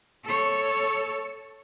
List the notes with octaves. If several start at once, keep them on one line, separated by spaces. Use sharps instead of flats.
A4 C#5